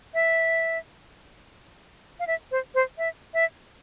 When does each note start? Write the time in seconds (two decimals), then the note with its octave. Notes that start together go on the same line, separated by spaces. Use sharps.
0.14 E5
2.20 F5
2.27 E5
2.51 C5
2.75 C5
2.98 E5
3.34 E5